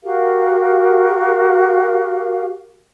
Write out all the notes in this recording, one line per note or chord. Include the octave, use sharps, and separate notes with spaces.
F#4 G4 A#4 F5